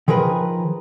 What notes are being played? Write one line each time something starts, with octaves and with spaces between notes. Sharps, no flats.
D#3 F3 G#4 A#4 B4